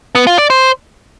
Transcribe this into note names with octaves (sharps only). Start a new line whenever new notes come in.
B3
F4
D5
C5